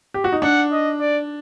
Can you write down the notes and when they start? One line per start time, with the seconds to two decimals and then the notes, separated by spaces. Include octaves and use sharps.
0.14 G4
0.24 F#4
0.32 D#4
0.42 D4 F#5
0.72 D#5
1.00 D5